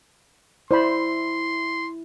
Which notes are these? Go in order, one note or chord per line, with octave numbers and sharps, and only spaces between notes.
E4 C5 D5 B5 C6